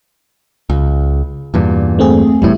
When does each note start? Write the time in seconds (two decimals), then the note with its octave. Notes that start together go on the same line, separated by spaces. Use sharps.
0.70 C#2
1.54 E2 G2 A#2
1.99 A3 C4 G#4
2.42 F1 E2 A2 G3 E4